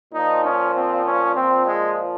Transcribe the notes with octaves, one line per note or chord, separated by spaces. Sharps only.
A#2 F3 D#4
C#4
C4
C#4
A#2 F3 C4
G#3